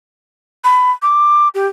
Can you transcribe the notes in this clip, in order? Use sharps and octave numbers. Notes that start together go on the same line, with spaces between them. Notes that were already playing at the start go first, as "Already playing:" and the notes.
B5
D6
G4